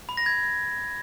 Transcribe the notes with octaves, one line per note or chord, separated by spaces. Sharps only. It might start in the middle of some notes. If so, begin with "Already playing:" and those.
B5
A#6
G#6